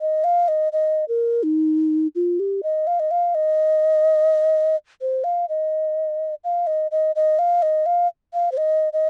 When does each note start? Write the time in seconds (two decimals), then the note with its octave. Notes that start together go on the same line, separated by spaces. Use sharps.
0.01 D#5
0.24 F5
0.48 D#5
0.73 D#5
1.09 A#4
1.43 D#4
2.15 F4
2.40 G4
2.63 D#5
2.87 F5
3.00 D#5
3.11 F5
3.35 D#5
5.01 C5
5.24 F5
5.49 D#5
6.44 F5
6.67 D#5
6.91 D#5
7.16 D#5
7.39 F5
7.62 D#5
7.86 F5
8.34 F5
8.52 C5
8.57 D#5
8.93 D#5